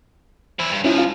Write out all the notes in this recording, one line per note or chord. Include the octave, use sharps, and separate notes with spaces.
E2 E4 C5
G2
G#2 F3 C#4 E4 F4
F4 F5